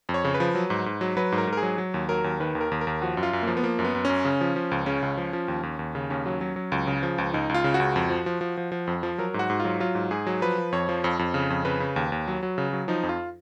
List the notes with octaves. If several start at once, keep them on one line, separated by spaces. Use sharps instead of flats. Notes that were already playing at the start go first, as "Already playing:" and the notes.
F2
C#5
C#3
B4
F3
F#3
G#2
G#2
F#3
F#3 B4
G#2
A#4
G#2
A#4
G#4
F#3
F#3
D#2
F#3 A#4
D#2
D#3 B4
D#2
A#4
D#2
A#4
D#2
F3 F#4
F#2
F4
F#2
F3 A#3
B3
F3 A#3
F#2
B3
F#2
F#2 C#4
C#3
F3
F3
C#2
C#3 C#4
C#2
F3
F3
D#2
D#2
D#2
C#3
D#2 C#4
F#3
F#3
F#3
C#2
C#3
F3
C#2
C#2 D#4
C#2 F4
C#3
F#4
C#2
F2
F3
F3
F3
F3
F3
F2
F3
F#3 A#4
G#2
F#4
G#2
F4
F#3
F#3 F4
G#2
G#2 G#4
F#3
F3 B4
F3
F2 C#5
F3
F2
F2
C#3
F2
C#3 B4
C#3
D#2
D#2
F#3
F#3
C#3
F#3
F3 D#4
F2
F4